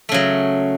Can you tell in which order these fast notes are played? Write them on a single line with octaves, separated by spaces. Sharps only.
A3 C#3 F#3